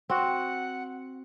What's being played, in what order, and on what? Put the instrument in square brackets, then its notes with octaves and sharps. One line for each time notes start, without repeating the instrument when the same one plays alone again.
[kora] C4 F#4 [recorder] F#5